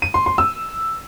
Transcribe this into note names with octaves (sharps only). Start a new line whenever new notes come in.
D#7
C6
C6
E6